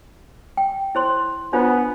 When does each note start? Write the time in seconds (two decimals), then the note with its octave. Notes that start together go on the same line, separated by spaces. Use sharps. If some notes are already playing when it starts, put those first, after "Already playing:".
0.57 G5
0.95 E4 C5 C6
1.53 B3 D4 F4 C5